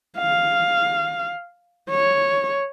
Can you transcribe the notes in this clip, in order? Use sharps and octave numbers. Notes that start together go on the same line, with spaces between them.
F5
C#5